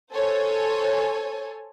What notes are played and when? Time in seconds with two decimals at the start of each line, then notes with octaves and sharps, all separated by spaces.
0.13 A4 C5 C#5 G#5